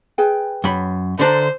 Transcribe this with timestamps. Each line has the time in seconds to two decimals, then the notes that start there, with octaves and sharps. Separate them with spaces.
0.18 G#4 B4 G5
0.64 F#2 B5
1.19 D3 D4 C5 A#5